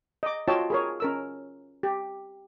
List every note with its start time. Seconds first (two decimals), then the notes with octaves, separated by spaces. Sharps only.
0.23 D#5 D6
0.48 F4 F#4 C#5 D#5 G5 A5
0.70 G#4 A#4 C#5
1.00 C#4 A#4 E6
1.83 G4